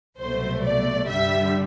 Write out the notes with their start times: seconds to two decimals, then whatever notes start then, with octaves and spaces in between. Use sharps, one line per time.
0.19 C2 B2 F#3 A3 C5
0.65 D5
1.09 G2 D3 G3 E5